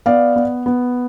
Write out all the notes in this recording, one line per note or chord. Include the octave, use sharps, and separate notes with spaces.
B3 D5 F5
B3
B3